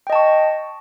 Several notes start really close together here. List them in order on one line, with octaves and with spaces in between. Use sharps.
G5 D#5 A5 C#6